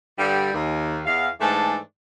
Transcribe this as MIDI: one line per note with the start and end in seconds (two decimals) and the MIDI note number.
0.19 0.52 43
0.19 0.52 50
0.19 0.52 55
0.54 1.00 39
1.05 1.28 40
1.05 1.28 77
1.40 1.76 44
1.40 1.76 52
1.40 1.76 57
1.40 1.76 62
1.40 1.76 69